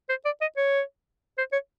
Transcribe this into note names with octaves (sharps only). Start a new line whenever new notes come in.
C5
D5
D#5
C#5
C5
C#5